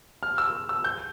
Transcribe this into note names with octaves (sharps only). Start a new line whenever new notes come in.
F6
E6
E6
G6